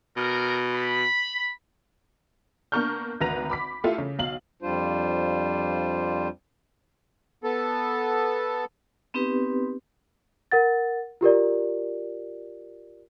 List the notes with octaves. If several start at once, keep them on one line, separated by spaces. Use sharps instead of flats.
B2 A#4
B5
A#3 B3 D4 C#6 F6 G6
G#1 D2 B4 A#5 A#6 F7
B5 D6 B6
A3 E4 F4 G4 A4
C#3
B1 F5 F#7
F2 G3 D4 F4 C5
B3 A4
B3 C4 D#4 G4 B4
A#4 F#5 A6
F4 G4 A#4 D5